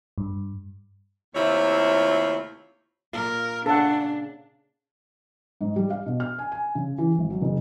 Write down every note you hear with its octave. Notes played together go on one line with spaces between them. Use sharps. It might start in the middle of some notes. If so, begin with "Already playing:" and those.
G2
D#2 C3 A3 E4 F4 C#5
A#2 A#3 F4 A#4
C#3 D4 A4 F#5
G#2
G3
F5
B2
F6
G#5
G#5
C#3
E3
G#1
F#3
F#1